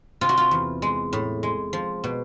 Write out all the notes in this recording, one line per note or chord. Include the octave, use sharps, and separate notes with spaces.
C3 F4
F#4
F4
E2
G#3
A2
G#3
F3
B2